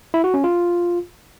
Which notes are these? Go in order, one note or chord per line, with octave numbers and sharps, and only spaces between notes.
E4
F#4
C#4
F4